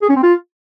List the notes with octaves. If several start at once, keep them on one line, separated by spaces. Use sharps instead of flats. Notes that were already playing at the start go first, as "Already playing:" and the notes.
G#4
C#4
C4
F4